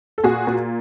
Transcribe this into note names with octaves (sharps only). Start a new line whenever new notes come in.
A4
A#2 F#4 G#4
A#2